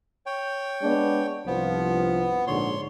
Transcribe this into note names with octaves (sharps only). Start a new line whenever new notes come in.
C#5 G5
G#3 B3 D4
C2 G2 F3 B3
A#1 G#2 D3 C#5 C6